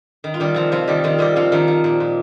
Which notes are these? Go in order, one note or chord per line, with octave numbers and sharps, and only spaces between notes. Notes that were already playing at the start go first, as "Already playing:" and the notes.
D#3
F4
D#3 G3 G4
C3 F3 F4
C3 F3 F4
D#3 G3 G4
D#3 F3 F4
C3 G3 G4
C3 F3 F4
D#3 F3 D#4
F3
A#2
A#2